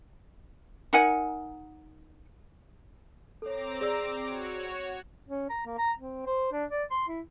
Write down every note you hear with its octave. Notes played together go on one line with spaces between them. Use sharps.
D#4 A#4 F#5 G#5
C4 A4 C#5 A#5 D6
G#4 D5 E6
F#4 C#5
C#4
A#5
A#3
A#5
C4
C5
D4
D5
C6
E4